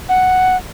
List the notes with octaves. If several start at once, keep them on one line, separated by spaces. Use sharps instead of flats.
F#5